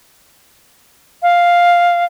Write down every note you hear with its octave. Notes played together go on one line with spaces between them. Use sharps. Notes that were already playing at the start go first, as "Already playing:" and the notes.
F5